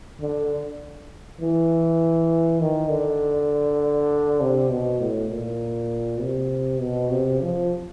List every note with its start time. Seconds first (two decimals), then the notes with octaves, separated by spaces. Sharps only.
0.20 D3
1.40 E3
2.60 D#3
2.89 D3
4.41 C3
4.71 B2
5.01 A2
5.30 A#2
6.21 C3
6.80 B2
7.10 C3
7.41 F3